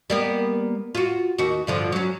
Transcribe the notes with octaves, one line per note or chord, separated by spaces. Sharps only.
G3 A#3 B3
F4 F#4
D#2 F#4
G2 D3 F3
F#3 C#4